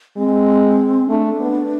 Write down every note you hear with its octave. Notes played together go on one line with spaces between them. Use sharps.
G#3 C4
A3 D4
B3